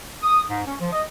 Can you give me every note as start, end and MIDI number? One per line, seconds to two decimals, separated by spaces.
0.23 0.43 87
0.50 0.63 44
0.67 0.76 61
0.80 0.89 53
0.93 1.02 75